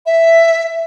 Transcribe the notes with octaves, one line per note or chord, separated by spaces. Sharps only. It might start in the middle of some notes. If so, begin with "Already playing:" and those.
E5